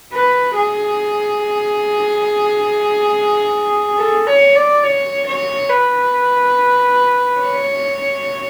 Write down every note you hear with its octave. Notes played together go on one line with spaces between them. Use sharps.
B4
G#4
A4
C#5
D5
C#5
C#5
B4
C#5